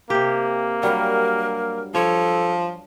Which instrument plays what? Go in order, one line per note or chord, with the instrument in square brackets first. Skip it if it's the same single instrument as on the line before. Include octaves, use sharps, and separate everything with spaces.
[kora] C3 G4 [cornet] A#3
[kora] G2 F#3 G3 [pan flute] A#4
[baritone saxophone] F3 [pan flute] A4 [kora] C#5